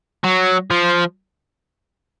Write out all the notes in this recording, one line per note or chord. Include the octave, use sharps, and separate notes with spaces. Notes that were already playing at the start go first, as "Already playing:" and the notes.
F#3
F3